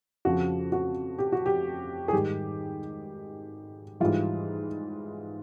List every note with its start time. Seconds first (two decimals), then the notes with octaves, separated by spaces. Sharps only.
0.25 F2 C#3 F3 F#4
0.72 F#4
1.19 G4
1.32 F#4
1.46 G4
2.08 G#4
2.13 G#2 D#3 G3 G4
4.00 G#2 E3 G3 F4